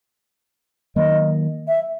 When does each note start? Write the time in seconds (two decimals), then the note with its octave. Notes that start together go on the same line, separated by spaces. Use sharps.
0.96 D#3 F#3 A#3 D#5
1.68 E5